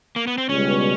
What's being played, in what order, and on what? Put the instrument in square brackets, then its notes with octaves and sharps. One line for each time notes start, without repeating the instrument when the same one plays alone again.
[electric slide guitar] A#3
B3
C4
[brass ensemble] C#2 B2 G3 [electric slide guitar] C#4